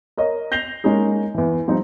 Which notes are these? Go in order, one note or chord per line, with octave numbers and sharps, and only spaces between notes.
A#4 C#5 D#5
G6 A#6 C7 F7 G7
G#3 A#3 C#4 D#4 G#4
E2 E3
F3 G3 C4 D#4